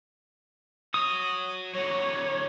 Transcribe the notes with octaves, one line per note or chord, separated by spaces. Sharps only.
F#4 C#5 D#6
D3 F#3 C#5